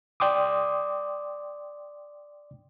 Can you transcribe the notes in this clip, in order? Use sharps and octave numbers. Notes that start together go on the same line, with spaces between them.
D5 G5 C6 D6 D#6